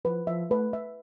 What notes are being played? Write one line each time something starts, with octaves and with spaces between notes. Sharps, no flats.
F3 B4
F3 E5
A3 B4
E5